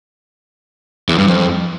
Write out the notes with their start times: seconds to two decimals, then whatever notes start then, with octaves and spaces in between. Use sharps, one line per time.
1.09 E2
1.18 G2
1.28 F2